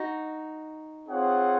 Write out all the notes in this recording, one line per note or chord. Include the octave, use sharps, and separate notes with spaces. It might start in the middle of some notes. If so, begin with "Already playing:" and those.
Already playing: D#4 F#4
C4 F4 G#4 C#5 F#5